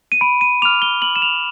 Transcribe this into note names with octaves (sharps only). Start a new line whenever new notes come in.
D#7
B5 D7
D#7
D6 F6 F7
G7
B5 F#7
E7
F7